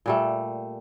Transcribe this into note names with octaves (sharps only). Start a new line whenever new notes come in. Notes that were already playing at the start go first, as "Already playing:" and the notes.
A#2 G3 A3